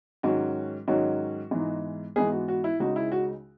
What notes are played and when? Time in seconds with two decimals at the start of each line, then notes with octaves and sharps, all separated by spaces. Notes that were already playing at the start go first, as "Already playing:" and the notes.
0.23 G#2 D#3 F#3 C#4 F#4
0.88 G#2 D#3 F#3 C#4 F#4
1.51 G#2 E3 G#3 B3 D#4
2.16 G#2 E3 G#3 B3 D#4 G#4
2.32 F#4
2.48 F#4
2.64 E4
2.80 C#2 C#3 G#3 D#4 F#4
2.96 E4
3.12 F#4